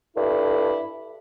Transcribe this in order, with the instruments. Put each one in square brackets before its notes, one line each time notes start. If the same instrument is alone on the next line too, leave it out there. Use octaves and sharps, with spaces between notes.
[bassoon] G2 [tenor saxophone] E4 [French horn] A4